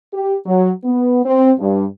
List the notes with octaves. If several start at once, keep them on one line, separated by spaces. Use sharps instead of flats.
G4
F#3
B3
C4
G2